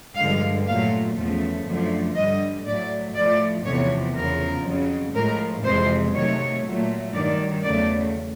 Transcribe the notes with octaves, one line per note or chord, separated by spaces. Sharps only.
G2 D3 F3 G#3 F5
A#2 F#3 A3 F5
E2 C#3 F3 A3
F#2 D3 F3 A3
G2 D3 G3 D#5
A2 F#3 A3 D5
A2 F3 A3 D5
E2 C3 F3 A3 C#5
E2 C#3 F3 A#4
F2 C#3 F#3
A2 F3 G#3 A#4
F2 C3 E3 G#3 C5
C3 D#3 F#3 A3 C#5
A#2 F#3 A3
G2 D#3 F#3 D5
E2 C#3 F#3 A3 D5